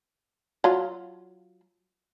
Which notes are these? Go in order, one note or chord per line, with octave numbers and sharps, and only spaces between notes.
F#3 F4